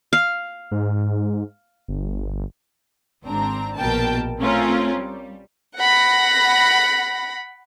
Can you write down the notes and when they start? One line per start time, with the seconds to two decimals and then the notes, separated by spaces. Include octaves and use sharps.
0.13 F5
0.71 G#2
1.88 G1
3.24 G#1 G#2 C4 D4 A#5
3.77 A#1 B2 A#4 G5 A5
4.41 A3 C4 C#4 F4 A#4
4.96 G3
5.79 F#5 B5 A#6